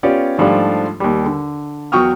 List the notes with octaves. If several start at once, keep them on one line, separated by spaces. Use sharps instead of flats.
B3 C#4 F4 G4 C#5 D5
G#2 F3 G3 A3 D4 F4
D#2 G3
D3
E2 F#3 G5 C#6 D#6 F6